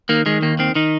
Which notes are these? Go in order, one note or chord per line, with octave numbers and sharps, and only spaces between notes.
D#3 A#3
D#3 G#3
D#2 A#3
D#3 C4
D#3 D#4